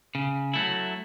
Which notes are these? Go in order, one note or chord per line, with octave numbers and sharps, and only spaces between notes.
C#3
F#3 A3 E4